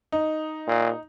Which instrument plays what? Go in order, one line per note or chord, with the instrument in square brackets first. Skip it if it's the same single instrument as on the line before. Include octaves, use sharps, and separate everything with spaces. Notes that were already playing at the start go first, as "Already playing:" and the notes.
[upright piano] D#4
[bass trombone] A#2